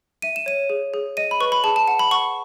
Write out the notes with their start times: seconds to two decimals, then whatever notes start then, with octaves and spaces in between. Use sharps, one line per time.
0.22 E5 D#7
0.36 E7
0.46 C#5 D#7
0.70 G#4
0.94 G#4
1.17 D#5 D#7
1.31 B5
1.40 B4 C#6
1.52 B5
1.64 G#4 A5
1.76 A5
1.87 F#5 A5
1.99 B5
2.11 F#5 C#6